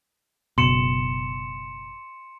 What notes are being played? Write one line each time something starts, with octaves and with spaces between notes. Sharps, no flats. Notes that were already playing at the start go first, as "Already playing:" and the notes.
F#1 B2 C6 C#7 E7